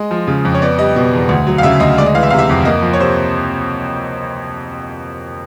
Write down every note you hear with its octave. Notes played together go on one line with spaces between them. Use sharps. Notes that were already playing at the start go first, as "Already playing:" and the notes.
Already playing: G#3 D#5
F3
C#3
F2
C#5
B3 D5
G3 D#5
B2
E2
D2
F#3
F5
C#3 E5
D2 D#5
G#3 D5
D#5
E3 F5
E5
C3 F5
E5
F2
A#3 D#5
F3
C#5
C3 C5